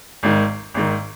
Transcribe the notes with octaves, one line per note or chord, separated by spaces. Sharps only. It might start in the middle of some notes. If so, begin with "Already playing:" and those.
G#1 G#2 D#3
G#1 G#2 D#3